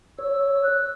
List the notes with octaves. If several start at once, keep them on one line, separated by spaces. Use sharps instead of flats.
C#5 E6
F#6